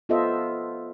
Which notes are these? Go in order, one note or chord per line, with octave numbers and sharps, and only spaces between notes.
B3 F4 A4 C5 D#5 E5